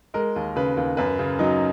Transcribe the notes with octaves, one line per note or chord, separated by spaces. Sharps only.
G#3 A#4
D#2
C#3 B4
D#2
F#2 B4
C#3
F#3 D#4